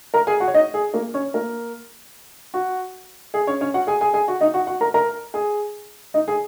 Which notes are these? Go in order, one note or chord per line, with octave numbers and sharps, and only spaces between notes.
A#4 A#5
G#4 G#5
F#4 F#5
C#5
D#4 D#5
G#4
A#3 A#4
C#4 C#5
A#3 A#4
F#4
G#4
C#4 C#5
C#4 C#5
F#4 F#5
G#4 G#5
G#4 G#5
G#4 G#5
F#4 F#5
D#4 D#5
F#4 F#5
F#4 F#5
A#4 A#5
A#4 A#5
G#4 G#5
D#4 D#5
G#4 G#5